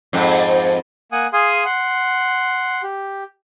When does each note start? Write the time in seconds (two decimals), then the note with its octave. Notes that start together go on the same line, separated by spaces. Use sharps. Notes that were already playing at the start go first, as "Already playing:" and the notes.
0.13 F2 G#2 C4
1.12 A#3 F#5 G#5 D#6
1.33 G#4 F5 G#5 C6 D#6
1.65 F#5 C6
2.83 G4